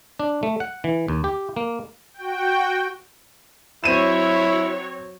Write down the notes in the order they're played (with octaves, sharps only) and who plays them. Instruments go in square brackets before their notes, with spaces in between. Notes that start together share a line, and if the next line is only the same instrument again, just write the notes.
[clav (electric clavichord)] D4
A3
F#5
E3
D#2
G4
A#3
[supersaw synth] F#4 G5
[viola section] F#3 C#5 [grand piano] C4 D#7 E7 [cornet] E4